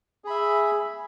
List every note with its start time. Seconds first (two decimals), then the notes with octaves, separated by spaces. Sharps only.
0.24 G#4
0.27 B5
0.30 E5